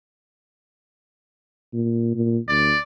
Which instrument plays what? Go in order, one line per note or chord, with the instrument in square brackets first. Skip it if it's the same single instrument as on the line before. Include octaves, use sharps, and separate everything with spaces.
[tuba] A#2
A#2
[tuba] D2 [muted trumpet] D5